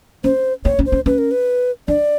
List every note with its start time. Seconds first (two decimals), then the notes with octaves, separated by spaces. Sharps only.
0.24 C#4 C5
0.65 C4 C#5
0.79 C#4
0.86 C5
0.92 C#4
1.06 C#4 B4
1.18 A#4
1.31 B4
1.88 D4 D5